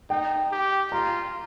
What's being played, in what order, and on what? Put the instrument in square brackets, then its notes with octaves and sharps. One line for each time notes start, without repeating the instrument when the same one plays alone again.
[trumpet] D#4 [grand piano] G5
[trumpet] G4
[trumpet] F4 [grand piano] A#5